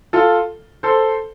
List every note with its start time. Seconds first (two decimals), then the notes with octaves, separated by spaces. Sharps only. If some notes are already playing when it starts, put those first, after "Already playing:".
0.13 F4 A4
0.83 A4 C5